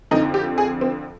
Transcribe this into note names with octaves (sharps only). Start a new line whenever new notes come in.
F2 D3 F3 D#4
G4
G#4
C4